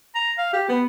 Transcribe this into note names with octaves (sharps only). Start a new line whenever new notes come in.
A#5
F5
G4
B3